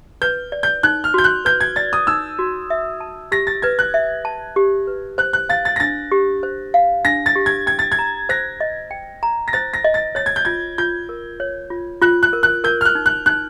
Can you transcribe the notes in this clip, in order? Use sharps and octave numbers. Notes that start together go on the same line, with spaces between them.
B4 G6
D5
G6
D#4 F#6
F6
F#4 G6
F#6
B4 G6
G#6
D5 A6
D#6
D#4 E6
F#4
E5
A5
G4 A#6
A6
B4 G#6
F#6
E5
A5
G4
B4
C5 F#6
F#6
F5 A6
A6
A#6
D4 A6
G4
C5
F5
D4 A#6
A6
G4
G#6
G5 G#6
A6
G#6
A#5
C5 A#6
D#5
G5
A#5
A#6
C5 A6
A#6
D#5
A6
C#5 A6
G#6
G6
F4 G#6
F4 G6
A#4
C#5
F4
F4 F#6
F#6
A#4
F#6
A#4 G6
F6
F#6
D#4
F#6
D#4 F#6